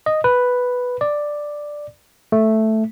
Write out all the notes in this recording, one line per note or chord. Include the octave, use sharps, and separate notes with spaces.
D#5
B4
D5
A3